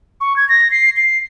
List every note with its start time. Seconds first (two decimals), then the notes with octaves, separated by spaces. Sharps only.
0.21 C#6
0.36 G#6
0.49 A#6
0.71 C7
0.97 C7